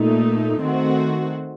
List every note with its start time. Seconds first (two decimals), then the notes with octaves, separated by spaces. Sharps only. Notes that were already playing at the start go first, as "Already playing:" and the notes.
Already playing: A#2 A3 D#4
0.61 D#3 A3 C4 F#4